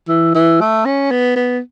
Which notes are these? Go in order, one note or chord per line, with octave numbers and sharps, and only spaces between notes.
E3
E3
A3
C#4
B3
B3